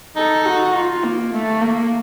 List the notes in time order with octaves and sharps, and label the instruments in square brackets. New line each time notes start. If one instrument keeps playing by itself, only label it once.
[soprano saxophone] D#4 [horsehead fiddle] A4
[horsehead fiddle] F#4
F4
A#3
A3
A#3